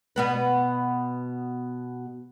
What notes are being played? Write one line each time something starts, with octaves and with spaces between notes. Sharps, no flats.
B2 B3 B4